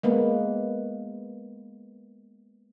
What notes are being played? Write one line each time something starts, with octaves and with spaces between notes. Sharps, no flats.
G#3 A#3 B3 B4